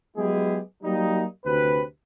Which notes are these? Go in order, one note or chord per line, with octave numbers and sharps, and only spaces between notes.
F#3 G#3 B3 E4 G4 G#4
F#3 G3 A#3 D#4
D2 C3 F#4 B4